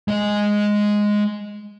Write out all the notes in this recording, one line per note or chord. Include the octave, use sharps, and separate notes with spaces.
G#3 D#5